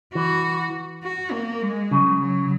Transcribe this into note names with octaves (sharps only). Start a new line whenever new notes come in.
E3 F#4
F#4
A#3
G#3
C#3 F#3
F#3